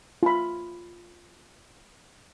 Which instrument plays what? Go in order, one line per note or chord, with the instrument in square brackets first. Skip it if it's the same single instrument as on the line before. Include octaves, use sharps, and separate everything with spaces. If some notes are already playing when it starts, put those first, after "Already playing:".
[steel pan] F4 B5